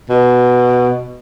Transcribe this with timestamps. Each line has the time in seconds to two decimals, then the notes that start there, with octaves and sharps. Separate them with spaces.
0.10 B2